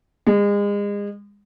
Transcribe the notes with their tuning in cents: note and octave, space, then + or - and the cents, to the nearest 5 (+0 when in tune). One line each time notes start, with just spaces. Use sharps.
G#3 -35